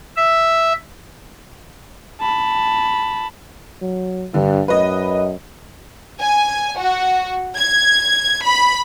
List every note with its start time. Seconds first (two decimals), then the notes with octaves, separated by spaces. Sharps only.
0.17 E5
2.20 A5 B5
3.81 F#3
4.34 G2 D3
4.68 F#2 B4 D#5
6.22 G#5
6.79 F#4
7.57 G#6
8.45 B5